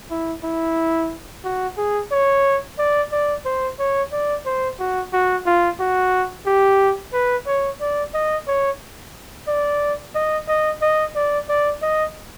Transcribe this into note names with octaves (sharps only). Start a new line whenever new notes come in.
E4
E4
F#4
G#4
C#5
D5
D5
C5
C#5
D5
C5
F#4
F#4
F4
F#4
G4
B4
C#5
D5
D#5
C#5
D5
D#5
D#5
D#5
D5
D5
D#5